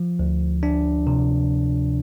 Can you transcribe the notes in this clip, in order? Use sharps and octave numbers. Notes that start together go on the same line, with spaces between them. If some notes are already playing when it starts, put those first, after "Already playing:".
Already playing: F3
D2
D4
C3